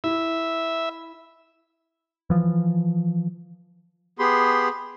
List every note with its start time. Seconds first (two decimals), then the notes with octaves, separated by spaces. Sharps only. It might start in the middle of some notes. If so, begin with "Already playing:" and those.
0.04 E4 E5
2.30 E3 F3
4.19 B3 G4 G#4 B5 C6